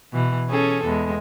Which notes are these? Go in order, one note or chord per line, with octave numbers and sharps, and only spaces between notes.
B2 E3
C#4 G#4 A4
E2 G#3